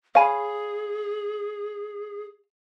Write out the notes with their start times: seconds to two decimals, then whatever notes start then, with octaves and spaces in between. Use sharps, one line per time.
0.15 G#4 C#5 F5 G#5 B5